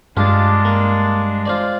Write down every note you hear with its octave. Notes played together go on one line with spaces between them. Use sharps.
G2 G#3 D4 F4 G4 A5
A#3
F4 C5 D5